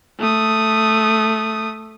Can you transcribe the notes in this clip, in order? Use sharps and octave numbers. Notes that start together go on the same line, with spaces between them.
A3 D#6